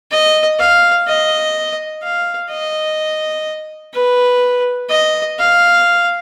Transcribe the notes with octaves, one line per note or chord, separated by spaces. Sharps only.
D#5
F5
D#5
F5
D#5
B4
D#5
F5